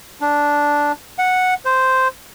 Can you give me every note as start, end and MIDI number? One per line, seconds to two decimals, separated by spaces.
0.21 0.92 62
1.19 1.54 78
1.65 2.08 72